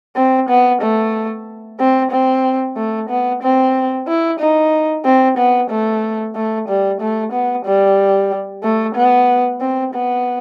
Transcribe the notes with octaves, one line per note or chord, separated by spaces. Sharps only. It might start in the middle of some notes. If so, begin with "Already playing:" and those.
C4
B3
A3
C4
C4
A3
B3
C4
E4
D#4
C4
B3
A3
A3
G3
A3
B3
G3
A3
B3
C4
B3